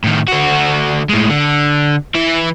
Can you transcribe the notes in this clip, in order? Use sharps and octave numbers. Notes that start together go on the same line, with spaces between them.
A2 D#3
D3 F#4
A2 G#3
D3
E3 E4